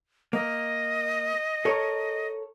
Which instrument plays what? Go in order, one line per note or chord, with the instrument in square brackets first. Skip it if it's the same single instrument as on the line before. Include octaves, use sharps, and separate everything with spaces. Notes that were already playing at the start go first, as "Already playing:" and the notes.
[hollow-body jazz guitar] A#3 [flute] D#5
[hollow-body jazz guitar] A4 A#4 C#5